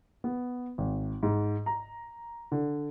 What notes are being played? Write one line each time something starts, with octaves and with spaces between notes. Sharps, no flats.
B3
G#1
G#2
A#5
D3